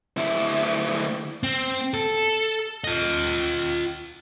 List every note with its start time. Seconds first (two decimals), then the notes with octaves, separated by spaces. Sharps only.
0.17 D2 E4
1.43 C4
1.94 A4
2.84 F4 D#5